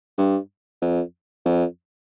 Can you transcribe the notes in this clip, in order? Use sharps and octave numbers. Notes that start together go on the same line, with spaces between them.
G2
F2
F2